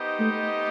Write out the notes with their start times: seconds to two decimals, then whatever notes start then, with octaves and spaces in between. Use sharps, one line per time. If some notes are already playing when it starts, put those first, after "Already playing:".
Already playing: B3 D#4 G4 C5 D#5
0.20 A3